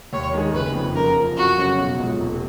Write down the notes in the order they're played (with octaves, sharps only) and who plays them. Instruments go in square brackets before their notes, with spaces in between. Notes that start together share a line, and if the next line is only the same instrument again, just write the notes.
[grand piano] D#2 [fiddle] C#5
[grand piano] D#3 G#3 D#4 G#4
[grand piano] F#1 [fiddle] B4
[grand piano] F2 F3
[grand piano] F#2 [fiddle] A#4
[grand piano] C#3 F3
[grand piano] F2 [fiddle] F#4
[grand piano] C#3 F#3 C#4
B1
A#2 G#3
F1